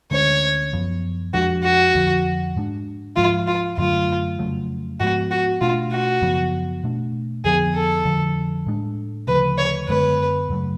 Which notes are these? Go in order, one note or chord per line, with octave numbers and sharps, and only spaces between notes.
D2 D3 G#3 C#4 C#5
F#2 F3 B3
F2 F3 G#3 D4 F#4
F#4
F2 D3 F3
G#2 G#3 D4
G#2 F3 G#3 F4
F4
F#2 D3 F#3 A3 F4
F2 C#3 F#3 A3
G#2 F3 G#3 B3 F#4
F#4
B2 A3 D4 F4
F#4
F#2 C#3 F3 B3
B2 A3 D4
F2 D3 F3 B3 G#4
A4
F2 D3 F3
A2 G#3 D4
D2 C#3 F3 B4
C#5
F#2 D3 G#3 B3 B4
F#2 C#3 F#3 A3